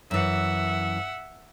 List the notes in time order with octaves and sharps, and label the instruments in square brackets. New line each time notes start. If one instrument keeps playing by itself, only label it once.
[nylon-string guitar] F#2 E3 [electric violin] E5 F#5